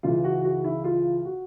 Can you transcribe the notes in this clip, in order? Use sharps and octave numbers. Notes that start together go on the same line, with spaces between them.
C#2 C#3 E3 F4
F#4
F#4
E4
F4
F#4